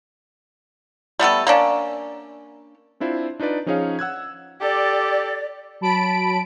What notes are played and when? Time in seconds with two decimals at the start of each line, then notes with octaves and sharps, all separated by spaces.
1.19 G3 A3 B3 A4
1.47 A#3 C#4 D4
3.00 C4 D4 E4 F4 C5
3.40 D4 D#4 F4 B4 D5
3.66 F3 C#4 D#4 G#4 C#5 F5
3.99 F#5 E6 F#6 G#6
4.61 G4 A4 D5
5.81 F#3 A5 B5 D7